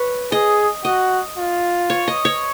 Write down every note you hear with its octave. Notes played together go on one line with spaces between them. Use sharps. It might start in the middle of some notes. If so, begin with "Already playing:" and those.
Already playing: B4 C#5
G#4 D#5
F#4 D#5
F4
C#5
D#5
C#5